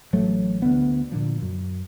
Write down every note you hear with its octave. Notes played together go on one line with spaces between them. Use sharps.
A1 F#3 A3
D2 B3
A#2 D3 F3
F#2